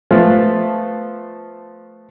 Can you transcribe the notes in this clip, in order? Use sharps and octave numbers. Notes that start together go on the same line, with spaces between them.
F3 A3 B3